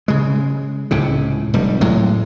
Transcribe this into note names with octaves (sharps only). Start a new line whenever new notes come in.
C#3 G#3
C#2 A2 C3
F1 G3
A2 F#3 G#3